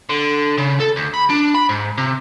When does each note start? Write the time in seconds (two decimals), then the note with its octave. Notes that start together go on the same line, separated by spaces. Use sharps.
0.10 D3
0.58 C#3
0.80 A4
0.96 D2
1.14 B5
1.30 D4
1.54 B5
1.69 G#2
1.98 C3